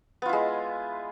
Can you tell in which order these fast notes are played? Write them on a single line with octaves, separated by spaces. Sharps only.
B3 F4 E4 G#3